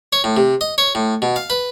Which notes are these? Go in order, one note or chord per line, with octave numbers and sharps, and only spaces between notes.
C#5
A2
C3
D#5
C#5
A2
B2
F5
B4